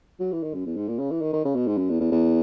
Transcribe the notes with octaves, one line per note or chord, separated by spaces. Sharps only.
F#3
E3
D#3
F#2
E2
G#2
A#2
C#3
E3
D#3
D#3
C#3
B2
G#2
F#2
E2
E2
E2